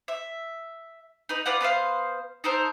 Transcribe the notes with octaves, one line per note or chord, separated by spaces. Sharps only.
E5
D#4 B4
F4 B4 D5 F#5
B3 B4 C5 F5
D#4 A4 A#4 C5